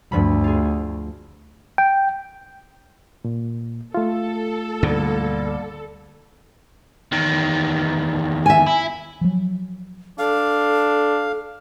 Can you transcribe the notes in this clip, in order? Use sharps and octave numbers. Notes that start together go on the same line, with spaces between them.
D2 G2 F3 B5
F4 G#4
G5
A#2
A3 F4 A4
D2 G#2 B2 D3 G3 A#3
E2 D#3
E5 G#5
E4
F3 F#3
D4 A4 F5